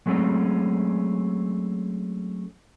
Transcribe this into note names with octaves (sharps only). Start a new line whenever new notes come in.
F#3 G#3 A3 C4 C#4